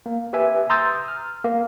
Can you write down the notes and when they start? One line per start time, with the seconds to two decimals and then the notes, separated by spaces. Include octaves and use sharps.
0.06 A#3
0.33 G4 B4 E5 G#5
0.70 A#5 C6 D#6 E6 G6 A6
1.08 F6
1.44 A#3